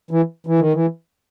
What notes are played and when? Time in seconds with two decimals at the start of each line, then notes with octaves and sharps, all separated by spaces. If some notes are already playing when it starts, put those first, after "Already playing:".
0.11 E3
0.46 E3
0.59 D#3
0.73 E3